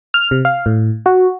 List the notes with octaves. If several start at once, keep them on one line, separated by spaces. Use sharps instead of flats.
F6
C3
F5
A2
F#4